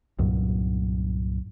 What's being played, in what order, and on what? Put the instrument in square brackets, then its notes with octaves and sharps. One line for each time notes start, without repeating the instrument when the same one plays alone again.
[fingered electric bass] C2 G2 A#2 F#3